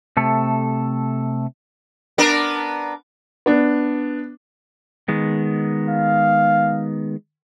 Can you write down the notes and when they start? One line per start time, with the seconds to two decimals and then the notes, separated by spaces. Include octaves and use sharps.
0.17 C3 A3 A4
2.18 B3 D4 A#4
3.46 B3 D4
5.08 D#3 G#3 B3
5.89 F5